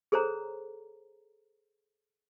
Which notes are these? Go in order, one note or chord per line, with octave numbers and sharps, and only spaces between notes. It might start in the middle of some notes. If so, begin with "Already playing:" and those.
G#4 A4 C5 C#5 A#5